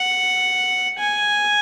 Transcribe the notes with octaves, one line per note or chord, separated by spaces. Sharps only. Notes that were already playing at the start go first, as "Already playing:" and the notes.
Already playing: F#5
G#5